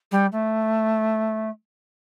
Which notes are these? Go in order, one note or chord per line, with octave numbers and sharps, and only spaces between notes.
G3
A3